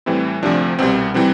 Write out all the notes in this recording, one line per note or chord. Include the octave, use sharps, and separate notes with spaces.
A2 E3 G3 C4 E4
D2 C3 F3 D4
C2 B2 G3 C4
C3 E3 G3 C4